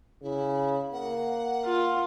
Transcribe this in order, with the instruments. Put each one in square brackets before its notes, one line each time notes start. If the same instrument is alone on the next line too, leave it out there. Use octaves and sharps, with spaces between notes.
[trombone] C#3 [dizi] E4
[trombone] A#3 [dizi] F#5
[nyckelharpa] F4